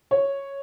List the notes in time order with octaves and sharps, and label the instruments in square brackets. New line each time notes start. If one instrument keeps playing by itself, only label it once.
[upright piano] C#5